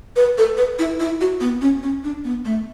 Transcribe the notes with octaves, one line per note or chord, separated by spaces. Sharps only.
B4
A4
B4
E4
E4
F#4
B3
C#4
C#4
D4
B3
A3